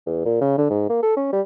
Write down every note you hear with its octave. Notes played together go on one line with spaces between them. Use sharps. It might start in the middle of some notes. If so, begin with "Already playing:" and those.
E2
A#2
C#3
D3
G#2
A#3
A4
C#4
G3